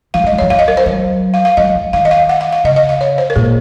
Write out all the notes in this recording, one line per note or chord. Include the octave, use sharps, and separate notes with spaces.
F3 F5
G#3
D#5
F#3
F3 C#5
F#3 F5
D#5
A#4
C5
F#3
F5
F5
F#3 D#5
F3
D#3 F5
D#5
F5
F#5
F5
F5
C#3 D#5
D#5
F5
C#5
C5
A#4
A#2 G#4